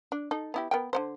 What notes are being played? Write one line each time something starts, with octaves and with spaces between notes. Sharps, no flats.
D4
D#4 A4
B3 E4 G4
B3 A#4 G5
D3 B3 C5